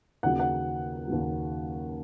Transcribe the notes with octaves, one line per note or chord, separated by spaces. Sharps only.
D#2 C#3 F#3 F#5
F#5
D#2 C#3 F#3